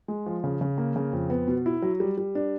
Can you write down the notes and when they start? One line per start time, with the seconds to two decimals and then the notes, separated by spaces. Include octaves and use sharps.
0.08 G#3
0.26 F3
0.44 C#3
0.61 C#3
0.78 A#3
0.96 C#3
1.13 F2
1.30 B3
1.48 B2
1.66 E4
1.82 F#3
2.00 G3
2.18 G3
2.35 D4